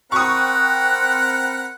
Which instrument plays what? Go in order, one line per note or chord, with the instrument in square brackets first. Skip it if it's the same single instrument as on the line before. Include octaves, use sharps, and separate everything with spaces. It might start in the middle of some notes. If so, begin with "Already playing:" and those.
[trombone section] C4 [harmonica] A#4 F#5 B5 [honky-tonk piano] C#6 D#6 [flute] F#6